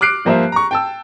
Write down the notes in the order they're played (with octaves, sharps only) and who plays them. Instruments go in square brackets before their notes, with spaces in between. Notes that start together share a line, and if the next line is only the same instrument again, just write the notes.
[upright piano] D6 F6 F#6 C7 D7
G2 F3 A#3 A#4 C5 E5
A#5 C#6
G5 A5 E6